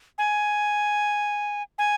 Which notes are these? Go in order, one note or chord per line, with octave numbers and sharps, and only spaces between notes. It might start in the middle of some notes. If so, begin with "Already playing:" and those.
G#5
G#5